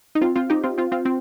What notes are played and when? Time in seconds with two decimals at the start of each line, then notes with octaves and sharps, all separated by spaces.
0.15 D#4
0.21 C4 F4
0.36 C4 F4
0.50 D#4 G4
0.64 C4 F4
0.78 C4 F4
0.92 C4 F4
1.05 C4